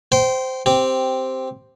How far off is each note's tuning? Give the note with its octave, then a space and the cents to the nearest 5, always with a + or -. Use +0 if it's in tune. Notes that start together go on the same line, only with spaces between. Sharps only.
C5 -10 G5 -25
C4 +0 G4 -5